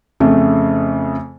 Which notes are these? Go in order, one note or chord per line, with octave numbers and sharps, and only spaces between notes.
F2 C#3 A3